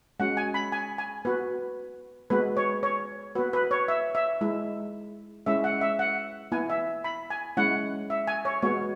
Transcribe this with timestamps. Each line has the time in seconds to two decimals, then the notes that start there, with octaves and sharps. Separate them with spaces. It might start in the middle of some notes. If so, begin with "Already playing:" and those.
0.20 G#3 C#4 F#4 F#5
0.37 G#5
0.54 B5
0.72 G#5
0.98 G#5
1.25 B3 F#4 B4
2.30 G#3 B3 F#4 B4
2.57 C#5
2.83 C#5
3.35 B3 F#4 B4
3.53 B4
3.71 C#5
3.88 E5
4.15 E5
4.41 G#3 E4
5.46 G#3 C#4 E4 E5
5.64 F#5
5.81 E5
5.99 F#5
6.52 B3 E4 G#5
6.70 E5
7.04 B5
7.30 G#5
7.57 G#3 C#4 E4 F#5
8.10 E5
8.27 G#5
8.45 C#5
8.62 G#3 B3 F#4 C#5